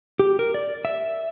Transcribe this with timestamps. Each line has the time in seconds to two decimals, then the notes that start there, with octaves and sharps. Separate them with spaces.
0.19 G4
0.39 A#4
0.54 D5
0.85 E5